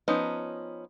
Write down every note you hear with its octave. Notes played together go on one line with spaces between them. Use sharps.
F3 B3 C#4 D#4